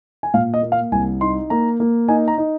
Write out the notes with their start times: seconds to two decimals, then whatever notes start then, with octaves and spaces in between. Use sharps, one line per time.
0.23 G#5
0.34 A#2 F5
0.54 D#5
0.62 A#3
0.72 F5
0.92 C2 G#5
1.21 D#4 C6
1.50 A#3 A#5
1.80 A#3
2.08 D#4 G#5
2.28 A#5
2.38 D#4